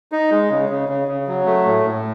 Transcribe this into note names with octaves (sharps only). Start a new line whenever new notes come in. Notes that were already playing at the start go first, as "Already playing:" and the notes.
D#4
G#3
C#3
C#3
C#3
C#3
F#3
A3
A2
A2